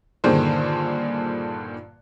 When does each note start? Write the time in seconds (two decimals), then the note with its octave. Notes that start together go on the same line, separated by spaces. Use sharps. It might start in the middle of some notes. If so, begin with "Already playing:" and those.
0.24 G2 A#2 D3 D#3 G#4 C5